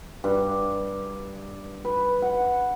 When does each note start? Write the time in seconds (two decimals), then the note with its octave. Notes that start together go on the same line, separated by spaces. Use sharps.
0.24 G2
1.85 B4
2.22 F#5